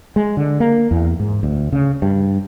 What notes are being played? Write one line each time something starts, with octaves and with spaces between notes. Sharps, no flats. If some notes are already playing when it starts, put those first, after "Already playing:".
G#3
D3
A#3
E2
G#2
D2
C#3
G2